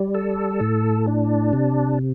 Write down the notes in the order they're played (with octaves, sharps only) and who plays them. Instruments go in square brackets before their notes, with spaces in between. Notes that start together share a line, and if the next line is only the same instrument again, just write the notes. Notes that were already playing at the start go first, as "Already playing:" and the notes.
Already playing: [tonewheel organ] G3
A4
A2
D4
C3